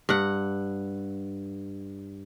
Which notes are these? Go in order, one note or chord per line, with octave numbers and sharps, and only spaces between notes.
G2 F#5